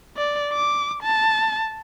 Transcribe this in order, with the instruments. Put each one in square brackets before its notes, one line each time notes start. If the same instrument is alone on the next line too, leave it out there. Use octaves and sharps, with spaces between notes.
[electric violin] D5
D6
A5